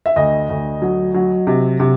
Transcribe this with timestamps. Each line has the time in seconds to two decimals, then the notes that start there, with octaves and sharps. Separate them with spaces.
0.06 E5
0.16 D2 D#5
0.49 D2
0.82 F#3
1.14 F#3
1.47 C3
1.80 C3